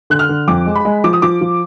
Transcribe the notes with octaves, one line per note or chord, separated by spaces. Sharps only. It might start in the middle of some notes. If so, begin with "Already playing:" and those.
D3 F#6
F6
D3
F2 D6
G#3
B5
G#3
F3 D6
D#6
F3 D6
F3